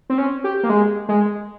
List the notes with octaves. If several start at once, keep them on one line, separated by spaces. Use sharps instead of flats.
C4
C#4
G4
A#3
G#3
G#3